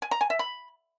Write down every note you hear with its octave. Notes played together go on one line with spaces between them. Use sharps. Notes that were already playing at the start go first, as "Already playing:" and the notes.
G#5
A#5
G#5
E5
B5